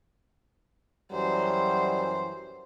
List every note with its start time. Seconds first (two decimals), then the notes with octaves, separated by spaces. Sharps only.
1.12 F#2 E3 F#3 G3 C5